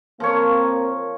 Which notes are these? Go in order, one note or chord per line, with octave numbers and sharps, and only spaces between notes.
F3 A#3 C4 A#4 C#5